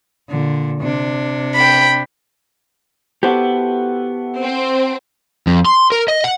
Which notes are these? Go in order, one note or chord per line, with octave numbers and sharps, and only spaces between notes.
A#2 D3
C3 D4
G5 B5
B3 E4 F#4 G4 A4 C5
C4
F2
C6
A#4
D#5
F#5